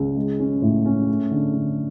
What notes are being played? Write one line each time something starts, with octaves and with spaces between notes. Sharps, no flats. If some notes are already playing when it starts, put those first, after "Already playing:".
Already playing: C#2
G#3
C#4
A2
C#4
A3
D3
D3